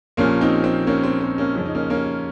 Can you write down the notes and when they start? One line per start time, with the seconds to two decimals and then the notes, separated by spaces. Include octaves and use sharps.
0.17 A#1 A#2 F3 A#3 C#4
0.41 C4 D#4
0.64 C4
0.87 A#3 C#4
1.03 C4
1.21 C4
1.38 A#3 C#4
1.55 F2 C#3 F3 C#4
1.65 D#4
1.75 A#3 C#4
1.90 A#3 C#4